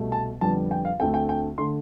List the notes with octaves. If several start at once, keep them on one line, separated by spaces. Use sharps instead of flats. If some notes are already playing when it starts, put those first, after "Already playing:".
Already playing: C2 B2 A3
A5
F2 D3 G3 B3 A5
G5
F5
D2 D3 A3 C4 G5
G5
G5
D3 A3 C6